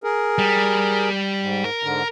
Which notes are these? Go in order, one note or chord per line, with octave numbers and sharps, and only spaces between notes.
G#4 A#4
G3
G#2
A#4
G#2 D3